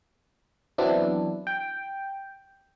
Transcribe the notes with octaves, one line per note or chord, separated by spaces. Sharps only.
E3 F#3 B3 C4 D4 E4
G5